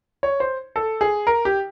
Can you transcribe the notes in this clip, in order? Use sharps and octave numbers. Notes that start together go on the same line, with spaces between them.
C#5
C5
A4
G#4
A#4
G4